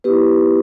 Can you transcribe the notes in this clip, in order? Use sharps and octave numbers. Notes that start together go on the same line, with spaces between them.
B3 E4 G4 B4